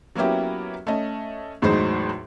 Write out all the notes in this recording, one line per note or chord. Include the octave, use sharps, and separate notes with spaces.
F#3 A#3 B3 C#4 E4 G4
A3 C#4 D#5
E2 A2 F#3 G#3 D#4 C5